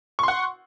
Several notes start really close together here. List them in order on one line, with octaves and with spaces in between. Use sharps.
C#6 C6 F#5